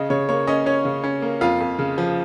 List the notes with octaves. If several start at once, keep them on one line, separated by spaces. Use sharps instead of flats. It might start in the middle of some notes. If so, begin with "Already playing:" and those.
Already playing: C#3 D#5
C#3 C#5
A#3 C#5
C#4 D#5
C#4 C#5
C#3
C#4
A#3
F2 F4 F5
F2
C#3
F3